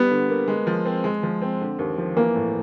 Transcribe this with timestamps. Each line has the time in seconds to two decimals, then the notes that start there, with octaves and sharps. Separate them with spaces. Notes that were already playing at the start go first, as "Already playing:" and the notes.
Already playing: G3 B3
0.11 D3
0.29 A#3
0.48 G#3
0.67 F3
0.86 C4
1.04 G#3
1.23 F3
1.42 C4
1.61 D3
1.79 D#2
1.98 F3
2.16 E3 A#3
2.35 A2